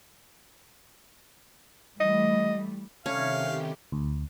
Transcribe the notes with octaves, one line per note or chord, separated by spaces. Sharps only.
E3 G3 A3 D#5
C3 D#3 G3 A3 C#4 D4 G4 F5
D2